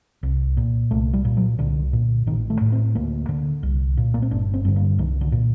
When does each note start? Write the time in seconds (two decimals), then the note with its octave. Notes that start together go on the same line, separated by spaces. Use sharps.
0.23 C2
0.57 A#2
0.91 C2 A3
1.13 G3
1.25 A#2
1.37 F#3
1.59 C2 D3
1.93 A#2
2.27 A1 D#3
2.50 A3
2.61 A2
2.72 C4
2.95 D2 A#3
3.29 D3
3.63 C2
3.97 A#2
4.14 A#3
4.22 C4
4.31 G1 D4
4.54 C4
4.65 G2 D3
4.76 A#3
4.99 C2 D#3
5.21 D3
5.32 A#2